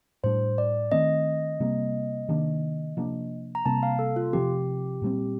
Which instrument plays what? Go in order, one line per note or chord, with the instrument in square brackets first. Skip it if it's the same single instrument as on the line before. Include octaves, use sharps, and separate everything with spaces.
[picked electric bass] A2 G3 D4 [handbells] C5
[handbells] D5
[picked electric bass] D#3 A3 C4 [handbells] D#5
[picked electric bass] C3 G3 A#3
C3 D#3 A#3 D4
C3 F3 A#3 D4
[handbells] A#5
[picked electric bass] C3 G3 A#3 [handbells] A5
[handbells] F5
A4
F4
[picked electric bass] C3 F3 C4 [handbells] G4
[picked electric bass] A#2 G3 C4